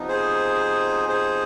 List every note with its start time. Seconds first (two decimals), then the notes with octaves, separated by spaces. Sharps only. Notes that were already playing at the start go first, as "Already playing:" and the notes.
Already playing: C3 F3 B3 D#4
0.08 G#4 C5
1.08 G#4 C5